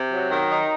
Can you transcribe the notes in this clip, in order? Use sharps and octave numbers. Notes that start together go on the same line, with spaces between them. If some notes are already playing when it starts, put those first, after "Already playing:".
Already playing: C3
F#3
D#3
D#4